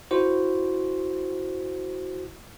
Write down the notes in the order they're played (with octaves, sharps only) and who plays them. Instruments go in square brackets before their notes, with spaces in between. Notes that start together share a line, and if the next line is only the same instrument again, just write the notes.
[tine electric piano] E4 F#4 C5